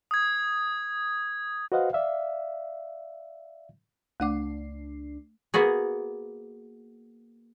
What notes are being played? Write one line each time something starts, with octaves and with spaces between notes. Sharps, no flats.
D#6 G#6
F#4 B4 C5 D#5 F5 F#5
D5 E5 F5
C#2 A3 D4 F#5 D6 C7
A#3 B3 F#4 G#4